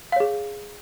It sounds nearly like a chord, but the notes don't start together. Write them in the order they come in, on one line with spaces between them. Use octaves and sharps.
F5 C#5 G#4